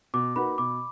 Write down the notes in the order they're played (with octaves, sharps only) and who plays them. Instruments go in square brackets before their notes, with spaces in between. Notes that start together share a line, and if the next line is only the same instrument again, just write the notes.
[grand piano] B2 [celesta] D6
[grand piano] A#3 D#4 F#4 B4 [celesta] B5
[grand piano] B2 [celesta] D6